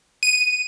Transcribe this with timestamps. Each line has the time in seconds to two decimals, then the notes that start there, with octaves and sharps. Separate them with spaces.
0.23 D#7